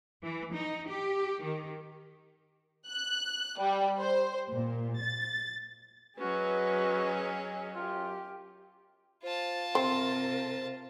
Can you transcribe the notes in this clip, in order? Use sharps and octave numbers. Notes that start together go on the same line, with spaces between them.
E3
D#4
G4
D#3
F#6
G3
C5
A#2
A6
F#3 C#4 F#4 G#4 B4 D#5
F#2 F4 G4
F4 C5 A5
C3 C4 A#4 C5